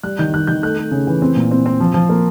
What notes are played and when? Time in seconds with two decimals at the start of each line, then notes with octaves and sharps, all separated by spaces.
0.03 G3 F#6
0.19 D#3 G6
0.34 D#3 F#6
0.47 D#3 G6
0.62 A3 F#6
0.77 A3
0.91 C#3
1.07 E3
1.22 C4
1.36 A#2
1.51 C4
1.66 C4
1.80 F3
1.94 F3
2.09 A#3